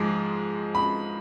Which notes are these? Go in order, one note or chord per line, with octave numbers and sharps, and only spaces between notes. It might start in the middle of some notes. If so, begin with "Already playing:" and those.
Already playing: G#2 F3 G#3 D6
B5